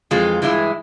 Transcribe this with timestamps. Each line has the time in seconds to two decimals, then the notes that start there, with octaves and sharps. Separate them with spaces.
0.11 F2 E3 G#3 F4
0.42 G2 E3 G#3 E4